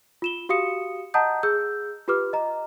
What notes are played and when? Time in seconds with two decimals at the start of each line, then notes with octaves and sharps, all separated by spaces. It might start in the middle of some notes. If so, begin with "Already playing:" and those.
0.22 F4 E7 G7
0.49 F#4 G4 F5 D#6 C#7
1.14 D#5 F#5 A5 A#5 D#6 G6
1.43 G#4 E6 G6
2.08 F4 G4 B4 D6 F6
2.33 D#5 A#5